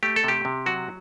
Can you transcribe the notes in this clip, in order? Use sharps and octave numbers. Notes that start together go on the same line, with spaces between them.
A3 G4
A4
C3 G4
C3
F#3 F#4